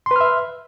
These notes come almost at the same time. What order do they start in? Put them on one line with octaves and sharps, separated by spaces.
C6 B4 F6 E5